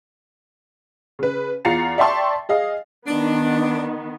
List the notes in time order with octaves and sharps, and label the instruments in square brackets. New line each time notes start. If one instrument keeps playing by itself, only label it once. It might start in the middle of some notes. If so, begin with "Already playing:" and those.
[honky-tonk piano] C#3 B4
E2 F4 A#5 A6 C7 C#7
D5 E5 G5 A5 C6 C#6
G#4 D#5 F5
[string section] D#3 B3 [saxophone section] D4